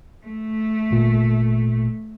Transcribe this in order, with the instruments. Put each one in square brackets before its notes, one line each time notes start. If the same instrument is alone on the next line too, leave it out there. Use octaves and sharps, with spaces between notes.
[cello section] A3
[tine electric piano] G1 A#2